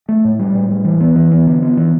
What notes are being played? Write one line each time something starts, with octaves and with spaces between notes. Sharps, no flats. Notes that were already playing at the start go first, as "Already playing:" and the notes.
A3
A2
G3
A2
G3
E3
B3
E3
B3
D3
B3
E3